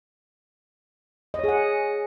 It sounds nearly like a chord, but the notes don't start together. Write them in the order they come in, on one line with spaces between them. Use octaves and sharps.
D#5 C#5 G#4 F#5